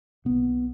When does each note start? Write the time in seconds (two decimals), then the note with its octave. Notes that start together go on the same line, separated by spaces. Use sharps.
0.25 B1 B2 B3